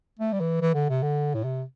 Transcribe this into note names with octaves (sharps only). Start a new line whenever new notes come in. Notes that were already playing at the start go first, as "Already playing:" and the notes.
A3
G3
E3
E3
D3
C3
D3
A2
C3